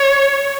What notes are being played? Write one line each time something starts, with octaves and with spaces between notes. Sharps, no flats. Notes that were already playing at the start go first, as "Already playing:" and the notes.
Already playing: C#5